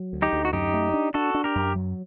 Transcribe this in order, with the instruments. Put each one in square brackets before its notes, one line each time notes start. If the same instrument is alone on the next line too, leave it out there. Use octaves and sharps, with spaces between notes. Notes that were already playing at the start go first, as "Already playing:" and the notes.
Already playing: [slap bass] F#3
D2
[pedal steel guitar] D#4 G4
[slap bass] D2
[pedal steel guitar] F#4
[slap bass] F#2 [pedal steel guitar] D#4 G4
[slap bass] A3
D4
[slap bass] D4 [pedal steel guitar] F#4 A4
[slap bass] D4
[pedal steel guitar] G4 A#4
[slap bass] F#2
F#3